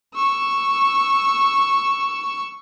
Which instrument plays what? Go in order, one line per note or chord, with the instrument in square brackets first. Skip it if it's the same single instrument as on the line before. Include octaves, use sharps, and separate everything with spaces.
[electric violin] C#6 E6